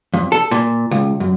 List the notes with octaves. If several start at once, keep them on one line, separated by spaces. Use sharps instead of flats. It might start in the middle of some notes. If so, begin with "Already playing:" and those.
F2
A4
A#2
C#2
F#2